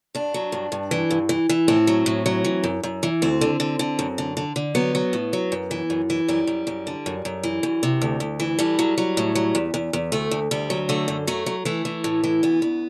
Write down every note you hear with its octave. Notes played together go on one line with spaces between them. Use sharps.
G2 D4
F#3
G2
G2
E3
G2
E3
E3
A2 C4
F#3
A2
F#3
E3
F#2
F#2
E3
D2 C4
D3
D3
D3
F#2
D3
D3
D3
F#3 B3
F#3
A2
F#3
F#2
E3
F#2
E3
F#2 G3
F#2
F#2
D3
F#2
F#2
E3
F#2
C3
D2
D2
E3
A2 G3
F#3
F#3
A2
F#3
E2
E2
E2
D2 A3
D2
D2 G3
F#3
D3 A3
F#2
F#3 A3
F#3
E3 A3
E3
A2
E3
D2 B3
D2